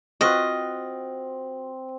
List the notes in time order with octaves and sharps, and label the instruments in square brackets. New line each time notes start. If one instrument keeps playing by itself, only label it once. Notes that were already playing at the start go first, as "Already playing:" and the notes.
[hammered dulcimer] C4 [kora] F4 F#4 B4 [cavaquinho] D#5